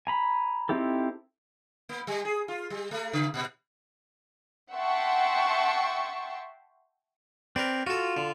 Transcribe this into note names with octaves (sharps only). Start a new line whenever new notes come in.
G#5 A#5 B5
C4 D#4 E4 G4 A4
A#3
G3
G#4
F4
G3
A3
C#3
A#2
E5 F#5 G5 A5 C6 C#6
C4 A#4 B4 D5
F4 F#4 A4
D3